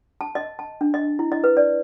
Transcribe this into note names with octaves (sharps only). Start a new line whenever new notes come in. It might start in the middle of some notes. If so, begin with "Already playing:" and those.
A5
D#5
A5
D4
D#5
E4
D#5
B4
D5